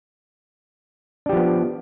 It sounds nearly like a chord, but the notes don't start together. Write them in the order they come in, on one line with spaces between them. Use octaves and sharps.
D4 G4 F3 B3